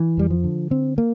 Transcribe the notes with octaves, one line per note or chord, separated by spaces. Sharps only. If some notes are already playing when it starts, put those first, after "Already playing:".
Already playing: E3
F2 G3
F3
D3
D3 C4
A#3